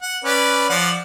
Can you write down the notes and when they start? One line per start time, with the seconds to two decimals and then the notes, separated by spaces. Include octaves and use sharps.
0.02 F#5
0.24 C#4 B4 D5
0.70 F3 D5 F#5